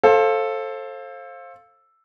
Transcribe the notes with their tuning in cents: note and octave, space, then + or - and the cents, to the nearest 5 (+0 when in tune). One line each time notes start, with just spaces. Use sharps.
A4 +0 C5 +30 F5 +0